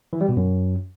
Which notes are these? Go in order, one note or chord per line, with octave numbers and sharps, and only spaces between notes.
E3
G3
B2
F#2